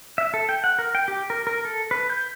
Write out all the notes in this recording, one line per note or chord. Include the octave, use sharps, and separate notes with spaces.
E5
A4
G5
F#5
A#4
G5
G4
A#4
A#4
A4
B4
G6